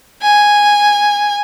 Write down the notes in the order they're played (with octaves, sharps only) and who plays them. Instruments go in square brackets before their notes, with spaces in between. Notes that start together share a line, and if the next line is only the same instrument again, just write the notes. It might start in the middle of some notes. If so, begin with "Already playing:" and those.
[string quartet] G#5